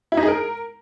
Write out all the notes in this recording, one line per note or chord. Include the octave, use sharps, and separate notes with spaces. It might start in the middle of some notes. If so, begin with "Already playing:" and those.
E4
D#4
G#4
A#4